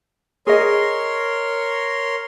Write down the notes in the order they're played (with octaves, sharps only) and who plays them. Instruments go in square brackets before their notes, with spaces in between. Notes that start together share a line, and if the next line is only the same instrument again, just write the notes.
[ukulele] G#4 D#5 [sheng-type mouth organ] A#4 C#5 C6